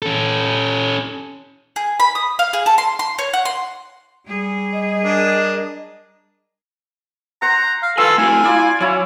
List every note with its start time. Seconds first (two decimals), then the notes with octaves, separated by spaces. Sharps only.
0.02 C#4 A4
1.76 G#4
2.00 B5
2.15 D#6
2.39 F5
2.53 G#4
2.66 A4
2.78 C6
2.99 C6
3.18 C#5
3.33 F#5
3.45 C6
4.26 G3 G#4
4.73 D#5
5.03 D4 A#4
7.42 C5 F#5 A#5
7.82 F5
7.98 F4 A4 B4 F5 G#5 C6 E6
8.18 A3 E4 F#4 G#5
8.44 E4 F4 D5 F5
8.81 F#3 C#4 E4